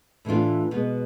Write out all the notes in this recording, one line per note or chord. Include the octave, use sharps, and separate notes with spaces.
A2 E3 A3 D4 F4
B2 G#3 B3